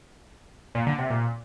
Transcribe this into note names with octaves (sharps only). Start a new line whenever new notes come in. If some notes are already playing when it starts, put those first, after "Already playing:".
A#2
D3
C3
A#2